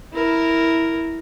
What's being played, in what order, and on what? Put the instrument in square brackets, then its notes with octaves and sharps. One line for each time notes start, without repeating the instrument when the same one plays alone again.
[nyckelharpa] E4 A#4